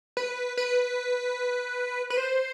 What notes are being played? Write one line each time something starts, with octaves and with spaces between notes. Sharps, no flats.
B4
B4
B4
C5